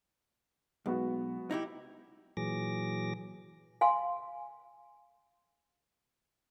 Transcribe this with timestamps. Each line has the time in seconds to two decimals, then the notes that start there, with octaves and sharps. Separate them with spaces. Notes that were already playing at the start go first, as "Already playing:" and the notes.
0.86 B1 G#3 B3 F#4
1.51 D#4 E4 G4
2.37 A#2 E3 F#3 G#4 D6 A#6
3.81 F5 G#5 C6